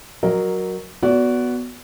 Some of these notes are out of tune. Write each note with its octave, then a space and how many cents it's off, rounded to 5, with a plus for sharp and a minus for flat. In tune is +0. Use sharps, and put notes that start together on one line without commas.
F#3 +0 A#4 +0 D#5 -35
B3 +0 F#4 +0 D5 -30